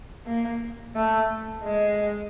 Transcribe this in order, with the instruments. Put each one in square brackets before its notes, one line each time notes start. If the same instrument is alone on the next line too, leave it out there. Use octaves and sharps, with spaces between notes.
[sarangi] A#3
A3
G#3